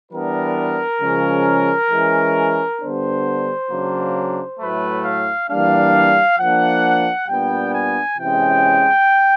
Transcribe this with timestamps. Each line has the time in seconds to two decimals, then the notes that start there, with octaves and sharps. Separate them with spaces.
0.12 E3 G3 B3 D4 A#4
1.01 C#3 F3 G#3 C#4
1.91 E3 G#3 C#4
2.81 D3 G3 B3 D4 C5
3.71 C#3 F#3 A#3 D4
4.60 A2 F#3 A3 B4
5.05 F5
5.49 E3 G3 A#3 D4 F5
6.39 F3 A#3 D4 F#5
7.28 A#2 G3 B3 D4 G5
7.74 G#5
8.18 C3 E3 G#3 C#4 G5